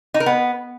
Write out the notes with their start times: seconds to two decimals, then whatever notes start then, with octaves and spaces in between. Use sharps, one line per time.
0.14 D#4
0.20 A#4
0.26 B3